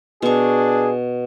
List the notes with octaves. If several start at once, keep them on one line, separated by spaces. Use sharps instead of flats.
B2 D4 G#4 C#6